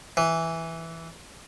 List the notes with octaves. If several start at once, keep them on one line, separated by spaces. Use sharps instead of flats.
E3